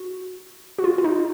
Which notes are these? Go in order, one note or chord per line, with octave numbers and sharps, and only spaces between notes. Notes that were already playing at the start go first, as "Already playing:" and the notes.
Already playing: F#4
F#4
F4
F4
D#4